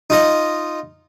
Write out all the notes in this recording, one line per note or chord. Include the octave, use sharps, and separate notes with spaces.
D#4 F4 D#5